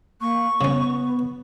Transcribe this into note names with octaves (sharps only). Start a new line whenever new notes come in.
A#3 C#6
C#3 B3 C#4